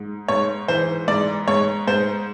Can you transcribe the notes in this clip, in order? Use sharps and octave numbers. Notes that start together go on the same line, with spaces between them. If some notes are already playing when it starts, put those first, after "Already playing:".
Already playing: G#2
G#2 C#5
E3 C5
G#2 D5
G#2 C#5
G#2 C5